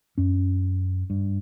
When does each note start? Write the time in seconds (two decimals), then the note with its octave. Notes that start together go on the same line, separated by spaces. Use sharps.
0.18 F#2 C#4
1.10 G2